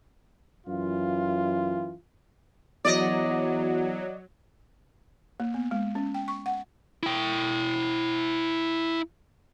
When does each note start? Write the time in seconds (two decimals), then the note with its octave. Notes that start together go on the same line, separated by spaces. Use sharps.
0.67 F#2 E3 F4
2.85 E2 F#3 D5 D#5
5.40 A#3
5.54 B3
5.71 G#3
5.95 C#4
6.14 G5
6.28 C#6
6.46 F#5
7.03 E4 G5